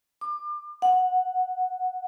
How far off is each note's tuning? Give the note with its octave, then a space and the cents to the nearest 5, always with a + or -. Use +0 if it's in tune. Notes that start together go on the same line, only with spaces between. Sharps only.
D6 +30
F#5 -10